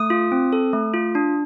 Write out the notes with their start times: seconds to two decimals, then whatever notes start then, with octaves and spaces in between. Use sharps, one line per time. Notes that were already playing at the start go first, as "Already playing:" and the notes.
Already playing: A3 D#6
0.10 F4
0.32 C4
0.53 A4
0.73 A3
0.94 F4
1.15 D4